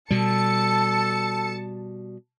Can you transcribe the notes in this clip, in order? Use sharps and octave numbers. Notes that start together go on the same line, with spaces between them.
B2 G3 A4 A5 C#7